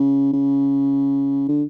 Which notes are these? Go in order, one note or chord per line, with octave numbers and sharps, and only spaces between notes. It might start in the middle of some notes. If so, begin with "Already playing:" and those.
Already playing: C#3
C#3
D3